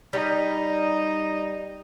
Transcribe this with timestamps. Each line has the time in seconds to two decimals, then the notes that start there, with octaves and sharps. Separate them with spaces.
0.13 G3 D#4